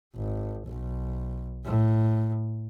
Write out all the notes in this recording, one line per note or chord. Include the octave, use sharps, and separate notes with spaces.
G#1
B1
A2